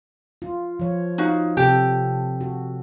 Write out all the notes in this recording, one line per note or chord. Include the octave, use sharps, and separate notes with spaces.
F4
F3 C#5
D#4 F#4 F5
C3 G4 A4
F#4